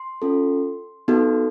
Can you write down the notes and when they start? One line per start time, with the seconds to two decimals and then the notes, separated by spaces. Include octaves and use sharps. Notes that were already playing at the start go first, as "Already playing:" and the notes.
Already playing: C6
0.22 C#4 F4 A4
1.08 B3 D#4 F#4 A4